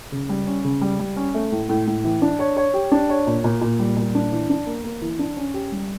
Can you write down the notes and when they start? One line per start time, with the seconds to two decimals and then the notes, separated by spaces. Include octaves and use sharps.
0.12 C#3
0.29 G3
0.47 C#4
0.64 C#3
0.81 G3
0.99 G3
1.16 C#4
1.35 A3
1.52 A2
1.69 A2
1.87 A2
2.04 E3
2.22 D4
2.39 C#5
2.57 C#5
2.74 G4
2.92 D4
3.09 C#5
3.27 A#2
3.44 A#2
3.61 A#2
3.79 G3
3.97 A#2
4.15 D4
4.32 E3
4.50 D4
4.66 A#3
4.84 A#3
5.02 E3
5.19 D4
5.37 C#4
5.54 G4
5.72 G3